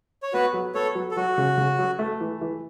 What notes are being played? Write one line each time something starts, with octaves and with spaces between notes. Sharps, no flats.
C#5
B3 F#4 B4
F#3
B3 A4 C#5
F#3
A4
F#3 F#4
C#3
C#3
F#3
A3
E3
E3